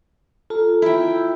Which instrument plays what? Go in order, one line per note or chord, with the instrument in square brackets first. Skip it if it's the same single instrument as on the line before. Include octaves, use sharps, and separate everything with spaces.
[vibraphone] F4 A#5 [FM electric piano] A4
[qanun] E4 G5